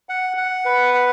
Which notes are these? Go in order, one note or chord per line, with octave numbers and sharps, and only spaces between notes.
F#5
F#5
B4
F#5